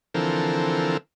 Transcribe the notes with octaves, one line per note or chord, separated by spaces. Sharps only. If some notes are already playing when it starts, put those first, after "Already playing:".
D3 E3 F3 C4 A4 A#4